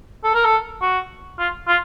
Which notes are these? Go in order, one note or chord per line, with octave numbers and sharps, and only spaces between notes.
A4
A#4
A4
F#4
F4
F4